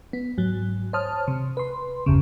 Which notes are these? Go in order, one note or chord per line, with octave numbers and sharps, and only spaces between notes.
B3
G#2 F#3
C5 C#5 A5 D#6 F6
C3
B4 C6
G1 E2 C#3